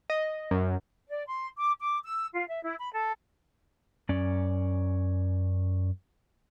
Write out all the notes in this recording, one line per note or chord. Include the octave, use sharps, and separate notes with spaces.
D#5
F#2
D5
C6
D6
D6
E6
F4
E5
E4
B5
A4
F#2 C#4 D5